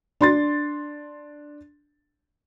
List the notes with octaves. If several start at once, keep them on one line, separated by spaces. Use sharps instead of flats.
D4 C6 A6